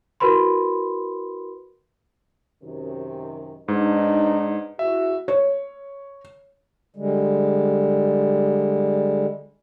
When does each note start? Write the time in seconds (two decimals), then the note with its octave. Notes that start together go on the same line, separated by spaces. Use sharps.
0.20 E4 F#4 A#4 B4 B5 C6
2.62 F#2 C3 D#3
3.68 G#2 D4 D#4 B4
4.79 E2 F#4 E5
5.28 C#5
6.96 D3 G3 G#3